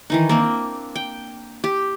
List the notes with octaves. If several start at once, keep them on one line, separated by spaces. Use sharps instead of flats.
D#3 E3 D#4
A#3 C4 D4
G5
G4